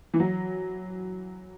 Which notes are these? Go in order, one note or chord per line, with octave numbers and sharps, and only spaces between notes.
E3
F#3